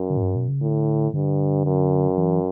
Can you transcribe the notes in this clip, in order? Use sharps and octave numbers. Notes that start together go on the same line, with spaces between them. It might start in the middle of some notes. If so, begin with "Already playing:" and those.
Already playing: F#2
D3
A2
G2
B2
C#3
A2 D3
G2 D3
F#2
E3